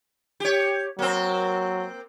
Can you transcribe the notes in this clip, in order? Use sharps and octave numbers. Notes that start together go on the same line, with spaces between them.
G4 C#5
F#3 A#3 C4